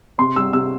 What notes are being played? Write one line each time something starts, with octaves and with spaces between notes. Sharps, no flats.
C3 C6
G3 E6
C3 E6